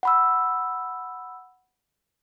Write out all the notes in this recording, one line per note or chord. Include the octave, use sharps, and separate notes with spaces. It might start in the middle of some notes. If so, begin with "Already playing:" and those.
F#5 B5 E6